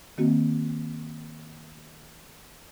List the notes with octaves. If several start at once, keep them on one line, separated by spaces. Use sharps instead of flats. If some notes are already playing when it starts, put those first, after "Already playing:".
D#3 A#3 C4 F#4